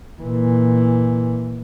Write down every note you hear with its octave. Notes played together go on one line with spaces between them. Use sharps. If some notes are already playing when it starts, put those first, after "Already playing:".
A#2 E3